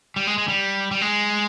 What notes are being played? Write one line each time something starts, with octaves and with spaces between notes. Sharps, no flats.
G3
G#3
G#3
G3
G3
G#3